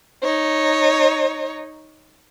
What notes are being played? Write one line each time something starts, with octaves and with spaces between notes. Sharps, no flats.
D#4 C#5